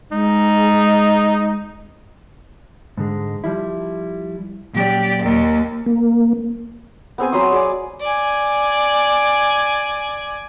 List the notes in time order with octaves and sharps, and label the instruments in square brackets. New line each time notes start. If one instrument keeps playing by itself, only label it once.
[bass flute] G#3 [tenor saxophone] D#4
[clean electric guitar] G#2 D3 G#3
F3 G3 E4
[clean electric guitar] A#2 F#3 C#4 [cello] G4 D5
[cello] D#2
[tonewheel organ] A#3
[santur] B3 C4 G#4 G#5
F#3 B5 C6 D#6
G#4 D5 G#5
[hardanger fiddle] D5 G#5